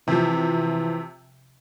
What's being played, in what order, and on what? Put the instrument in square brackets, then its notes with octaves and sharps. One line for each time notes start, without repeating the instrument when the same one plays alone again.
[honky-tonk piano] C3 F3 [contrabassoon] E3